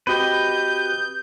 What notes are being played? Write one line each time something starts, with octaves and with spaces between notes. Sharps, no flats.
C4 F#4 G4 B4 D#5 G6